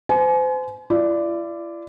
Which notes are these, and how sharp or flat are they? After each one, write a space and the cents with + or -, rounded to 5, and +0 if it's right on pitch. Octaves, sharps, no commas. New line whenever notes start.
C5 -35 G#5 +35
E4 +45 D5 +0